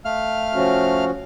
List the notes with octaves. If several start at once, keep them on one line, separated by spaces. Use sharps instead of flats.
A3 F5 F6
F3 C#4 F#4